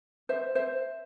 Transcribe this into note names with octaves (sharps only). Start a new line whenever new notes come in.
C5 E5
C5 E5